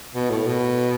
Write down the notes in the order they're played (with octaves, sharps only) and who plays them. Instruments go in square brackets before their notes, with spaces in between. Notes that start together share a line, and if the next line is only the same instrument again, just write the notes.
[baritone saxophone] B2
A2
B2